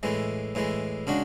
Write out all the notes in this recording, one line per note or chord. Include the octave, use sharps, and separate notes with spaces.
A2 E3 G#3
A2 E3 G#3
C#3 G#3 D4 F#4